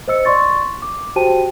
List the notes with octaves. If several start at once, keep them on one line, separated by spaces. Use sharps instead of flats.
C5 D#5 E6 C#7
D5 C6 C#6 A6
D6
F#4 G4 C5 G5 A5 D#7